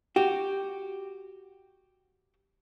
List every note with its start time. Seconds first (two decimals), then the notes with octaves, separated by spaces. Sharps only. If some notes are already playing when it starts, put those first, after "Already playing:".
0.16 F#4 G4